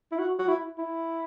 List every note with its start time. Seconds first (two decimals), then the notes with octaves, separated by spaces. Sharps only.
0.12 E4
0.19 F#4
0.39 F#4
0.48 E4
0.78 E4